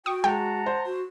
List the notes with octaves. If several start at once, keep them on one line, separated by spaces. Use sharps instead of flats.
F#4 G5 C#6 D#6
G#3 F#5 G5 A5 A#5
C5
F#4